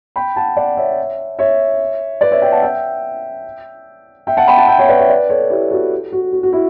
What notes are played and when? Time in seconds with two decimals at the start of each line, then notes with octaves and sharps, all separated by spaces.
0.16 G5 B5
0.36 F#5 A5
0.57 D5 F#5
0.77 C#5 E5
1.39 C#5 E5
2.21 B4 D5
2.31 C#5 E5
2.42 E5 G5
2.52 F#5 A5
2.62 E5 G5
4.27 E5 G5
4.37 F#5 A5
4.48 G5 B5
4.58 F#5 A5
4.68 E5 G5
4.79 C#5 E5
4.88 B4 D5
4.99 C#5 E5
5.09 B4 D5
5.29 A4 C#5
5.50 E4 G4
5.71 F#4 A4
6.12 F#4
6.33 F#4
6.43 F#4
6.53 E4